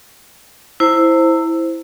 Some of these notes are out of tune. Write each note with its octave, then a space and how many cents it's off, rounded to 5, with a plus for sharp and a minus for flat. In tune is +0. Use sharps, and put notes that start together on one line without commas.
E4 +0 C5 +0 A#5 -40